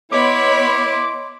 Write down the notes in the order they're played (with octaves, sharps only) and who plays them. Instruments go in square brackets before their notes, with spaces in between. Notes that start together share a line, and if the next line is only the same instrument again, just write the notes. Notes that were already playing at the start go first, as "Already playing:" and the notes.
[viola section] B3 C#5 B5 [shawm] E4 [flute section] D#5 C6 [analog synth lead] D6